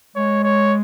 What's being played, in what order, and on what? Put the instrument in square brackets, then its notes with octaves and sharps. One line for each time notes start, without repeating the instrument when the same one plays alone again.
[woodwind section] G#3 [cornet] C#5
[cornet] C#5